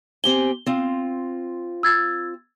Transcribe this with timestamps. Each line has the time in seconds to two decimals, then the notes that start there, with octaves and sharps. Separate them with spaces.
0.24 C4 G4 G#5 G7
0.66 C4 F4
1.83 E6 G#6 A6